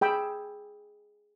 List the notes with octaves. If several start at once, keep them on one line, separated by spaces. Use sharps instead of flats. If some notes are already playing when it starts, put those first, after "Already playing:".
G#4 G5 B5 E6